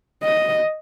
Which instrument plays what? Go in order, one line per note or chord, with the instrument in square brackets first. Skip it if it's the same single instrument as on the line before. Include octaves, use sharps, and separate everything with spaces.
[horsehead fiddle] D#5